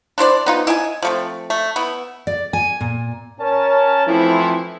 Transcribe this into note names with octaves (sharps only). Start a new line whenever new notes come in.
D4 E4 C5 D5
B3 D#4 F4
E4 D#5 G5 G#5
F3 A3 C4
A3
B3 E4
D5
G#5
A#2
C#4 A#4 C#5 A5
E3 F3 A3 C4 E4